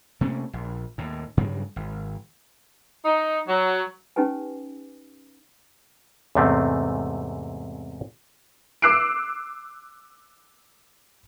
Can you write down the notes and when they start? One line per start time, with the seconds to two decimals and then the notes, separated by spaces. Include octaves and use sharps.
0.21 C3 A3 A#3 C#4
0.53 A#1
0.98 D#2 A2
1.37 G2 C#3 F#3 G3
1.76 G#1
3.05 D#4
3.48 F#3
4.16 C#4 D#4 G4 B4 G#5
6.35 E2 G#2 C3 A3 C4 C#4
8.82 D6 E6 F#6 C7 D7